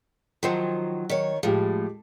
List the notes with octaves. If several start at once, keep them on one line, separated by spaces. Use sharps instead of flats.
D#3 F3 F#3 C5
D#3 C#5
A2 F3 G#3 G4